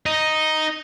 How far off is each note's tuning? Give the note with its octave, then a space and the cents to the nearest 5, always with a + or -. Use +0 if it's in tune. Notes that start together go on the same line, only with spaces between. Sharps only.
D#4 +0 D#5 +0